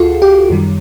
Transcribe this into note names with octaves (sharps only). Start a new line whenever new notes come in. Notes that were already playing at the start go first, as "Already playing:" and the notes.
Already playing: D2 F4 F#4 G#4 A4
G4
F#2 D#3 G3